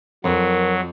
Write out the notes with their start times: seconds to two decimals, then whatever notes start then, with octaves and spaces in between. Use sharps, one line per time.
0.24 F2 F#3 A#4